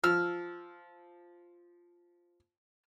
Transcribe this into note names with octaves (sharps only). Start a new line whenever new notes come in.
F3 E6 F6